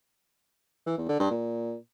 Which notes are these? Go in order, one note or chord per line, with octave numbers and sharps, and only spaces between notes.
E3
E2
D3
G2
A#2